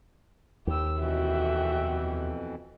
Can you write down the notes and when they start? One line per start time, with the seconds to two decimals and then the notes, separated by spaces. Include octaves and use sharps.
0.67 D#2 G4 E6
1.00 F2 B2 E3 F#4 E5 G5